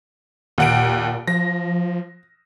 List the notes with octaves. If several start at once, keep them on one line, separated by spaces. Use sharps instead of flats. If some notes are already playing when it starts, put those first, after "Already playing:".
D#2 A#2 F#5 D7
F3 A#6